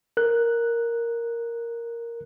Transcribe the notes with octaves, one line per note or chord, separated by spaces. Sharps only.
A#4 F#6